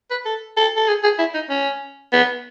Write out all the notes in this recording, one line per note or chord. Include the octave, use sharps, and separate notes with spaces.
B4
A4
A4
A4
G#4
G#4
E4
D#4
C#4
B3